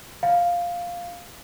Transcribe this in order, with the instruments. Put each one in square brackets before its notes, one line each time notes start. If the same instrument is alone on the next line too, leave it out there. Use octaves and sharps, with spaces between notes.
[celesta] F5